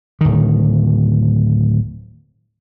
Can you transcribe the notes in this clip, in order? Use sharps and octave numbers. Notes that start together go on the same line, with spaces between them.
D1 D#3